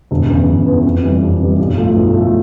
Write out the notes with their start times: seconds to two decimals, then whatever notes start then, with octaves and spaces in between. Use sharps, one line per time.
0.11 E1
0.30 E2 C#3 E3
0.48 E1
0.66 E2 C#3 E3
0.85 F2
1.03 C3 E3 G3
1.22 F2
1.40 C3 E3 G3
1.59 B1
1.78 A2 F3 A3
1.96 B1
2.13 A2 F3 A3